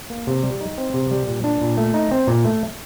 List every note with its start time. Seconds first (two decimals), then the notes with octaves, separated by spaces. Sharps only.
0.10 A#3
0.27 C3
0.43 G3
0.61 D#4
0.78 C4
0.94 C3
1.11 G3
1.27 A#2
1.44 D4
1.62 A#2
1.78 A3
1.94 D#4
2.11 C4
2.28 A#2
2.45 A3